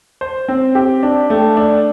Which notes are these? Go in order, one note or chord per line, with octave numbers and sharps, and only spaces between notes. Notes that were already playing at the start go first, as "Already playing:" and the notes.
C5
C4
G4
D4
A3
D4